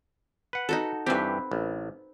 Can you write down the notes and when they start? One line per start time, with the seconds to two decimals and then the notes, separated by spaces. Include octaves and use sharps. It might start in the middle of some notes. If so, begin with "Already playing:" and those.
0.53 B4 F#5
0.69 D#4 F#4 A4
1.06 G2 E3 C4 G4 B4
1.51 A1